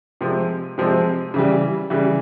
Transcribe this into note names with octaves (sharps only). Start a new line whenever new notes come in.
C3 F3 G#3 C4
C3 F3 G#3 C4
C#3 E3 G3
C#3 E3 G3